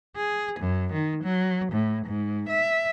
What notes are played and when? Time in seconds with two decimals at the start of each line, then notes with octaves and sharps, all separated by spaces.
0.16 G#4
0.60 F#2
0.93 D#3
1.24 F#3
1.72 A2
2.06 G#2
2.49 E5